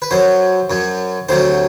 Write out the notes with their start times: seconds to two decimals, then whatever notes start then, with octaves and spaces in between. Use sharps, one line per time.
0.02 B4
0.11 F#2 F#3 C5
0.70 F#2 F#3
1.29 D2 C3 F#3 C5